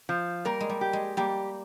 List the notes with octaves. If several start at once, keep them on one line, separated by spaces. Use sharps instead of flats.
F3
G3 A#3 A#4
G#3
G3
G4
G#3
G3 A#3 G4